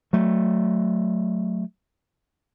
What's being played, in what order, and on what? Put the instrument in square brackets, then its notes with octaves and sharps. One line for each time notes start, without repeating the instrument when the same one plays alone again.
[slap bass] F#3 A3